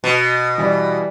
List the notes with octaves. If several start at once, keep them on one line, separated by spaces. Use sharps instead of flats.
B2
E3 G3